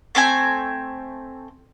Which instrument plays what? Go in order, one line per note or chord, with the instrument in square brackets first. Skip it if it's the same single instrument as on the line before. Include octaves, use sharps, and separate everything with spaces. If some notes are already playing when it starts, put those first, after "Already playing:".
[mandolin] A3 C4 G5 G#5